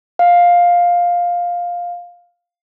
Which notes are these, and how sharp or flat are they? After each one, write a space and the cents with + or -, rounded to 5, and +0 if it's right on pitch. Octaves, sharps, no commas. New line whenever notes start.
F5 +10